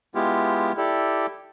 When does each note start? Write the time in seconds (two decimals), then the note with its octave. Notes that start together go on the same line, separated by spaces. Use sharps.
0.15 G#3 B3 E4 F4 G4
0.77 E4 G4 A4 D5